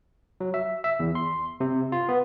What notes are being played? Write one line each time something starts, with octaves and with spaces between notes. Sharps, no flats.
F#3
E5
E5
E2
C6
C3
F4
B3